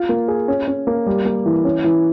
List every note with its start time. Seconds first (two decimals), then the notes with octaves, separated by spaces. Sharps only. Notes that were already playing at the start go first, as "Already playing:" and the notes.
Already playing: F4
0.09 A#3
0.28 G#4
0.48 C#4
0.68 C#4
0.87 A#3
1.06 G3
1.25 A#3
1.46 E3
1.64 C#4
1.84 E3